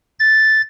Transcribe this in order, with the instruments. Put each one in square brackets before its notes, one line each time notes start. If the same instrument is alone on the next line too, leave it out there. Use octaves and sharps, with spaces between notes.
[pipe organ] A6